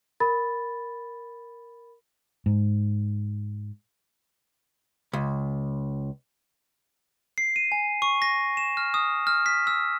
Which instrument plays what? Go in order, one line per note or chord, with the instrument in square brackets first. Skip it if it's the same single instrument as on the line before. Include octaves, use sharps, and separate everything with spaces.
[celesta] A#4 B5 A6
[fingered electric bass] G#2
[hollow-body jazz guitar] C#2
[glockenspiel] C7
D#7
G#5
C#6
A#6
E7
F6
D#6
F6
B6
E6